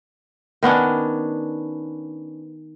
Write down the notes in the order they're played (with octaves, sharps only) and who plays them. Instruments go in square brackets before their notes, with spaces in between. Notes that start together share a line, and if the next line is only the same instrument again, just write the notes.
[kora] D#3 B3 C#4 D4